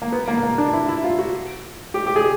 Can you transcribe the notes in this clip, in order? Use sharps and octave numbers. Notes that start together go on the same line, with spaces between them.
A#3
B3
A#3
A#3
D4
E4
E4
F4
F#4
G4
G4
G#4